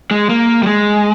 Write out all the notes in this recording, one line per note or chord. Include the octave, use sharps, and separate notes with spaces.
G#3
A#3
G3
G#3